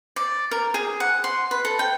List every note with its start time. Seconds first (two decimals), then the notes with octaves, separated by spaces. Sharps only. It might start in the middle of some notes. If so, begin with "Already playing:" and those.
0.16 D5
0.51 A#4
0.74 G#4
1.00 F#5
1.24 C6
1.51 B4
1.65 A4
1.79 G5